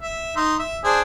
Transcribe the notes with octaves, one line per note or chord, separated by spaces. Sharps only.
E5
D#4 C6
E5
D4 G#4 C5